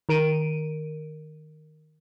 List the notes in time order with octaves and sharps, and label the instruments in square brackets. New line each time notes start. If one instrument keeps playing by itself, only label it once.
[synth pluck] D#3 A#4 D7 D#7